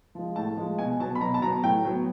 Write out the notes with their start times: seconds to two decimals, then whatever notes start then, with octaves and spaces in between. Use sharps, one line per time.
0.15 F3 G#3
0.36 A2 A5
0.57 F3 G#3
0.78 B2 G#5
0.99 F#3 B3 A5
1.15 B5
1.21 B2 A#5
1.34 A5
1.42 F#3 A#5
1.46 B3
1.63 A2 G5
1.84 F#3 B3